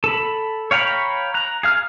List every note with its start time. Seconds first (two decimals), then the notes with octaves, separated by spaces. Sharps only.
0.04 A4 B5
0.71 C#5 F5 G5 A#5 B5
1.34 A#5 F#6
1.63 G#4 F5 F6